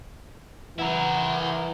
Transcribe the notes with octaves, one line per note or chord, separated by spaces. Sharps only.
E3 E4 A#4 F#5